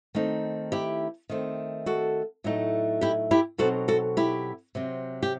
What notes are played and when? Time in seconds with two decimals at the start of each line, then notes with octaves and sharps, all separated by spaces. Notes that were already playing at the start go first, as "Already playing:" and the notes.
0.15 D#3 A3 C4 D#4
0.72 E4 G4
1.29 D#3 A3 C4
1.86 F#4 A4
2.44 A2 F#3 A3 D#4
3.01 E4 G4
3.31 E4 G4
3.58 B2 F#3 C4 D#4 F#4 A4
3.88 F#4 A4
4.17 E4 G4
4.75 C3 F#3 C4
5.23 G4